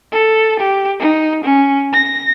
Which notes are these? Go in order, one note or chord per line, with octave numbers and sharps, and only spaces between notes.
A4
G4
D#4
C#4
A#6